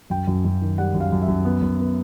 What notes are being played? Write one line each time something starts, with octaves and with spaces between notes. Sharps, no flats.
F#2 G5
F#2
F#2
D#3
G3 F#5
F#2
F5
F#2
E5
F#2
B3
F#2
B3